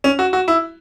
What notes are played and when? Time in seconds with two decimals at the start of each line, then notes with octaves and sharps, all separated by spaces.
0.04 C#4
0.19 F#4
0.33 F#4
0.48 E4